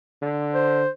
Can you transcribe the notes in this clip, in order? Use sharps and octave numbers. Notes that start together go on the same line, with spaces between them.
D3
C5